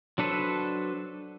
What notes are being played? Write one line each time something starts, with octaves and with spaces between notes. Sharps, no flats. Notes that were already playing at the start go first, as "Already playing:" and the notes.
F#3 D4 A4 B4 C5